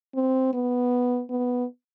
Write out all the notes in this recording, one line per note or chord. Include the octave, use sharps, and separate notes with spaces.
C4
B3
B3